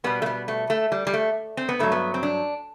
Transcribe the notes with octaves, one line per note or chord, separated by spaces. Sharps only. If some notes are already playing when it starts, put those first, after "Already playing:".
B2 G3 B3
A3
B3
A3
A3
G3
G3
A3
C4
B3
G2 F#3 A3
B3
C4
D4